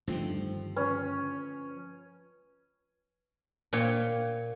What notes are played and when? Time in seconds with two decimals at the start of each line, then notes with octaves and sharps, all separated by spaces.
0.08 G2 D3 D#3 F3 A3 C4
0.76 C#4 B4
3.73 A#2 C#5 G5